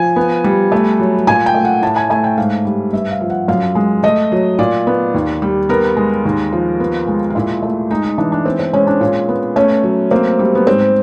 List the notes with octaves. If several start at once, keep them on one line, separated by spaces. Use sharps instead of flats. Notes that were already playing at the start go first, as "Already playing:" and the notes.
Already playing: F3 G#5
B3
G3
A3
F#3
A#2 G#5
G5
A3
F#5
A2 A5
G#5
A3 G#5
G5
G#2 F5
G3
G2 E5
F5
F3
F#5
F#2 F5
G#3
A3 D#5
F#3
A#2 D5
B3
D#2
G3
B3 A#4
G#3
D#2
F3
B3
G#3
F4
A#2 E4
A3
G#3 D#4
D#4
E3 D4
D4
B3 C4
C4
G#3 C#4
D4
A#2 C#4
B3
A3 C#4
F#3
A#3 C4
G3
B3
G#2 C4